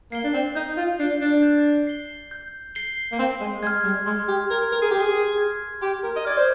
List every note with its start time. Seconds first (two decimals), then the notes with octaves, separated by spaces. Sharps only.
0.12 A#3 C7 G7
0.24 D4
0.34 C4
0.55 D#4 G6
0.77 F4
0.99 D4 C7 G7
1.21 D4
1.43 G6
1.87 C7 G7
2.31 G6
2.75 C7 G7
3.12 A#3
3.19 C4 C6
3.41 G#3
3.62 G#3 F6 G#6
3.84 G3
4.06 G#3 C6
4.28 G4
4.50 A#4 F6 G#6
4.72 A#4
4.82 G#4
4.91 G4 C6
5.00 G#4
5.38 F6 G#6
5.81 G4 C6
6.04 A#4
6.16 D#5
6.25 D5 F6 G#6
6.37 C5